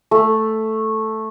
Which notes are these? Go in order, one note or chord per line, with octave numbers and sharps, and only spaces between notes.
A3